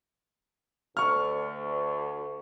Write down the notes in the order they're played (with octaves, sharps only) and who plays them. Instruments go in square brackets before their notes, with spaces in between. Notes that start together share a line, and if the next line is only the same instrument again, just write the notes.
[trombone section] D2 [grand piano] C#6 F6